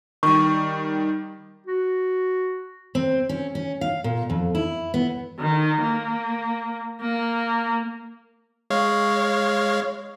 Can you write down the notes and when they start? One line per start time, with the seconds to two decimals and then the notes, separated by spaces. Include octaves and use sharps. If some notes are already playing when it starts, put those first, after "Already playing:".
0.23 D#3 G3 C#6
1.67 F#4
2.95 C4
3.29 C#4
3.55 C#4
3.81 F5
4.04 A#2
4.30 F2
4.55 E4
4.94 B3
5.39 D#3
5.81 A#3
7.01 A#3
8.70 G#3 C#5 F5